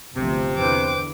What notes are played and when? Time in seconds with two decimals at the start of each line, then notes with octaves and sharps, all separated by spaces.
0.16 G1 D2 C3 F3
0.58 E2 D3 E3 B4 C5 G5 D6